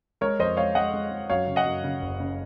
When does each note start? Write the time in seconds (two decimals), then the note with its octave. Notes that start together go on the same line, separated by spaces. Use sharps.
0.21 G#3 A#4 C#5
0.39 F2 C5 D#5
0.57 G#3 C#5 F5
0.75 G#3 D#5 F#5
0.94 G#3
1.11 G#3
1.30 F#2 C#5 F5
1.48 C#3
1.56 D#5 F#5
1.65 F#2
1.84 C#3
2.01 F#1
2.20 C#3